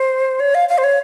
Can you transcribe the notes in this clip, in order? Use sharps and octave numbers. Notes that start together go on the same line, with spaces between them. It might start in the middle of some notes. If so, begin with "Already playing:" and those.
Already playing: C5
C#5
F5
F5
C5
C#5